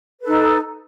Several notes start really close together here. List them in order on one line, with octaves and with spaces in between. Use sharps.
B4 A4 D#4